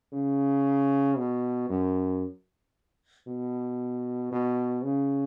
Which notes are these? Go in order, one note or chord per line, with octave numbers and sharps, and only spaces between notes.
C#3
B2
F#2
B2
B2
C#3